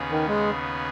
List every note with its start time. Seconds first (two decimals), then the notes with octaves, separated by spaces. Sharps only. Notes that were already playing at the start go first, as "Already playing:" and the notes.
Already playing: D#2 C#3 B3 G#4 B4
0.11 D#3
0.28 G#3